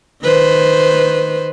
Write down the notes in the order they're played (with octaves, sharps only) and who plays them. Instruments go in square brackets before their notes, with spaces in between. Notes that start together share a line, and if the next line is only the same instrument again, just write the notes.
[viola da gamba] D#3 B4 C5